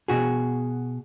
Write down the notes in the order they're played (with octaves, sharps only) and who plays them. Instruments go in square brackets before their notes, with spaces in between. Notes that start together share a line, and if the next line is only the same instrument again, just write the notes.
[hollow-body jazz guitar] B2 F#4 G#4